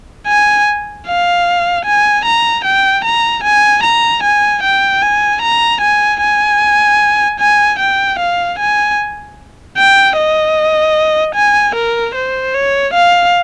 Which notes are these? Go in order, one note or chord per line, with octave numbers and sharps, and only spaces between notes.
G#5
F5
G#5
A#5
G5
A#5
G#5
A#5
G#5
G5
G#5
A#5
G#5
G#5
G#5
G5
F5
G#5
G5
D#5
G#5
A#4
C5
C#5
F5